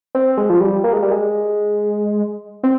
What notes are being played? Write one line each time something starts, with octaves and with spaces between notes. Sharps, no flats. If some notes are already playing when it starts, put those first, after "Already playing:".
C4
G#3
F3
G3
A#3
G#3
G3
G#3
C4